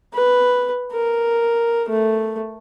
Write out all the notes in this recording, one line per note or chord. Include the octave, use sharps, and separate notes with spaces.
B4
A#4
A3